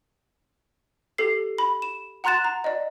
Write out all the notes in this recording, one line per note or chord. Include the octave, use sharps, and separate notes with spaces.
G4 A4 C7
B5
E7
F#5 A#5 C6 F#6 A6 E7
A#5
D5 D#5